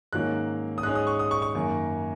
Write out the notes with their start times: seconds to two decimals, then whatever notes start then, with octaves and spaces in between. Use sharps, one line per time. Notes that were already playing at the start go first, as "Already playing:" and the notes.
0.12 G#2 D#3 F#3 A#3 C#4 F#6
0.78 D#6
0.83 G#2 G#3 C#4 F#6
0.95 D#6
1.07 C#6
1.19 D#6
1.31 C#6
1.42 C#6
1.55 F#2 D#3 A#3